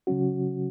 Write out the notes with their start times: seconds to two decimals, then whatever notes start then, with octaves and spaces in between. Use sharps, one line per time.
0.07 C#3 F#3 C#4 F#4